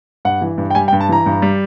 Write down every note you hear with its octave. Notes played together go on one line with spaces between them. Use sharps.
G2 F#5
E3
G2
G5
G3 G#5
G5
G2
A5
E3 A#5
G2
G3